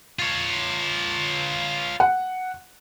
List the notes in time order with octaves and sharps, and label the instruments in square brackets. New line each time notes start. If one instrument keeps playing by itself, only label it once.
[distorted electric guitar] F4 C#5
[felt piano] F#5